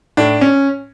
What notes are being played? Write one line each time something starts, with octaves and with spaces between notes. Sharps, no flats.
A2 D4
C#4